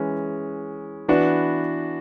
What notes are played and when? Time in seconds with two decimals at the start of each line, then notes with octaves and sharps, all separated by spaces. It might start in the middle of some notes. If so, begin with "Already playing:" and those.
Already playing: E3 G#3 C#4
1.08 E3 B3 D4 F#4